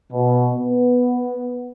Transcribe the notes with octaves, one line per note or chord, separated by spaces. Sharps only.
B2
B3